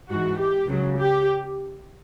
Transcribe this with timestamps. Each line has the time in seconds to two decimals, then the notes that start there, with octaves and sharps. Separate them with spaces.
0.10 G#2 E3 F#4
0.39 G4
0.67 C#2 C#3 F#3
0.97 G4